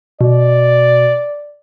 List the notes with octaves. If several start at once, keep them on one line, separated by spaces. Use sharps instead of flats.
B2 D5